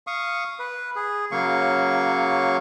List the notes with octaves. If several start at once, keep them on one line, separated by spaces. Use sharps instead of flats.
F5 C#6 D#6
B4
G#4
C#3 F#3 A#3 F5 C#6